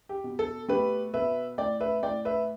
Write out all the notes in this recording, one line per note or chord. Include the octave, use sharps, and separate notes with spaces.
G4
B2
A4
A3 G4 B4
B2 B4 E5
A2 D5 G5
B4 E5
A2 D5 G5
B4 E5